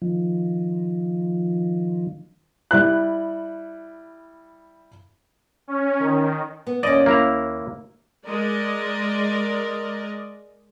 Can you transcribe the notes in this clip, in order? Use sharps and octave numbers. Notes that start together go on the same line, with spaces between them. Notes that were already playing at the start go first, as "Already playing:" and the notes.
D#3 F3
G3 E4 F#6
C#4
D#3
B3
D#2 C#4 D5 D#5
A#3 E4 A#5
G#3 A#4 D5 D#5